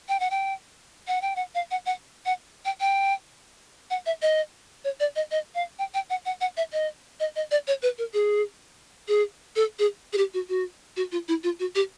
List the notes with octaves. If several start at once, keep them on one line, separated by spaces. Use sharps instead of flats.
G5
F#5
G5
F#5
G5
F#5
F5
F#5
F#5
F#5
G5
G5
F#5
E5
D#5
C#5
D5
D#5
D#5
F5
G5
G5
F#5
F#5
F#5
E5
D#5
D#5
D#5
D5
C#5
B4
A#4
G#4
G#4
A4
G#4
G#4
G4
F#4
F#4
F#4
F4
E4
F4
F#4
G4